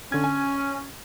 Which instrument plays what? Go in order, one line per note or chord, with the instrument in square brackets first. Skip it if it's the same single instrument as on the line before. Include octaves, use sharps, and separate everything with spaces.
[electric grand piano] D3 G#6 [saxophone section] C#4
[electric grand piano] G#5